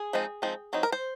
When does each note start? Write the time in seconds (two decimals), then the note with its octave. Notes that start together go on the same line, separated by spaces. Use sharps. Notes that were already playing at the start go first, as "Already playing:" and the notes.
Already playing: G#4
0.13 F3 G#3 C4 D#4
0.42 F3 G#3 C4 D#4
0.73 F#3 C4 D#4
0.83 A#4
0.92 C5